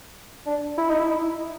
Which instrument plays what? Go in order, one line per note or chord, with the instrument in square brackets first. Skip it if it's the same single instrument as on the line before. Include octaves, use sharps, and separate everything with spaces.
[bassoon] D4
E4
D#4
E4